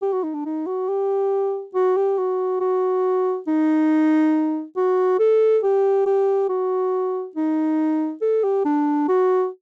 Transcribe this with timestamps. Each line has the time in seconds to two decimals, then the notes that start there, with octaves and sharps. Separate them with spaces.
0.02 G4
0.13 F#4
0.23 D#4
0.34 D4
0.45 D#4
0.67 F#4
0.88 G4
1.74 F#4
1.96 G4
2.18 F#4
2.60 F#4
3.47 D#4
4.77 F#4
5.19 A4
5.63 G4
6.06 G4
6.49 F#4
7.36 D#4
8.22 A4
8.44 G4
8.65 D4
9.08 F#4